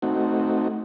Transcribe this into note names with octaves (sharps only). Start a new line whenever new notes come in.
A3 C4 D#4 F#4